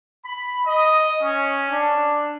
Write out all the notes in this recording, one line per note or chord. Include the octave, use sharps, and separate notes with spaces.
B5
D#5
C#4
D4